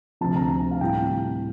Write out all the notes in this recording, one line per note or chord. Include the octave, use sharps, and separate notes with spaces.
D2 C3 F3 A5
A#5
A5
F5
A2 G3 C4 G5